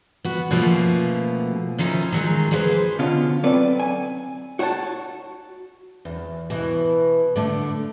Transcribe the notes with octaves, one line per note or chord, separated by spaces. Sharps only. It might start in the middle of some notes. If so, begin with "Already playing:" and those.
B3 F#4
B2 F3 A3 A#3 C#4
D#3 F3 C#4 D#4 E4
D#3 F#3 G#3
F3 A#3 G#4 B4 C5
B2 D3 C#4 F4
F#3 C4 A4 B4 D5
G#5
F#4 C#5 F#5 G5 A5
E2
B2 E3
D3 A3 D4